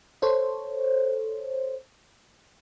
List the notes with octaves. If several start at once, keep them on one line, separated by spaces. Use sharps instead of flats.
A4 C5 C#5